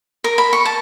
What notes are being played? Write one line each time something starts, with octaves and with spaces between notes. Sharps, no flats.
A#4
B5
C#6
A5